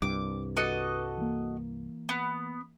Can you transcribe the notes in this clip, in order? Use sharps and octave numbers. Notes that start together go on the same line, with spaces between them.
C2 G2 D6
F#4 A4 B4 D#5 D6
E3 A#3
B3